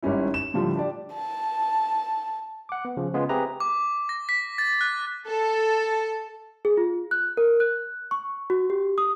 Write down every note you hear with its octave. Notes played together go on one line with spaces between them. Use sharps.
G#1 G3 C#4 E4
E7
A2 D3 F3 G3 F4
D4 G4 D5
A5
F#5 D6
B3
C#3 F3
C#3 G#3 B3 C#4 F4
C4 G4 G#4 B4 E5 A#5
D6
A#6
B6
A6
F#6
A4
G#4
F4
F#6
A#4
F#6
C#6
F#4
G4
D#6